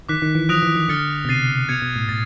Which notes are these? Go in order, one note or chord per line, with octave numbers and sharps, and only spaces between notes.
D#3 D6 F#6 B6
D#3
E3
F3 D#6 F#6 A#6 D7 F7
E3
D#3
D3 F6 A6 C#7
B2
C3 A6 C7 D#7
B2 G#6 C#7 F7
B2
A2
A2 A6